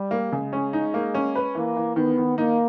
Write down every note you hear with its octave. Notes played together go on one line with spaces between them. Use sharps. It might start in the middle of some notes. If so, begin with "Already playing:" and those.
Already playing: G3
A#3
C#3 G#3
C#4
D#4
A#3
C#4
B4
E3 A#3
E3
D#3 B3
D#3
A#3 D#4